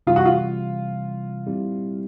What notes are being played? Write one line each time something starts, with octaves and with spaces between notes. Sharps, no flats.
C3 E3 G3 F4
F#4
F4
A#2 G3 C4 E4 G4